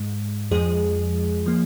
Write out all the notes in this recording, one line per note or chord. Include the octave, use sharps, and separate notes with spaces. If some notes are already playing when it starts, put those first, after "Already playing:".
Already playing: G#2 G#3
F2 F3 G#3 G#4
F3 A#3